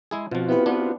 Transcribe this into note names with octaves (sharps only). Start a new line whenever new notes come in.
G#3 E4 G#4
B2 F3 C4 F4 F#4
B3 E4 G4 B4
B3 D4